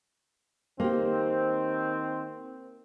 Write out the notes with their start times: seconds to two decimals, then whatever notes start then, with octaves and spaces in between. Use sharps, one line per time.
0.80 D#3 A#3 C4 G4